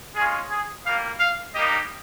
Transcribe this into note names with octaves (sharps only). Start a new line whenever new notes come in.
G#3 C#4 F4 G#4
G#4
G3 A#3 F4 F5
F5
G3 A#3 D#4 G4 D#5